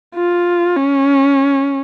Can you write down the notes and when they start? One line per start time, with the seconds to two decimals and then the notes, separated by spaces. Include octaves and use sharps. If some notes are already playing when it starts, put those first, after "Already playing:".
0.15 F4
0.77 C#4